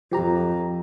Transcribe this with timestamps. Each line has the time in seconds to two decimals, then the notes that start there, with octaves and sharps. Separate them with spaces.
0.11 F2 F3 G4 A#5